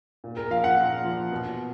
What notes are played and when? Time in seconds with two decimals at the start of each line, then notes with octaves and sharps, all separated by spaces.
0.24 A#2
0.37 A#4
0.51 F3 F5
0.64 F#5
0.77 A#2
1.05 F3
1.32 B2